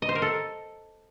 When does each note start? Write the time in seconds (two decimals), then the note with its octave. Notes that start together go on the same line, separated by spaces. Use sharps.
0.02 D#5
0.09 C5
0.15 A#4
0.22 A4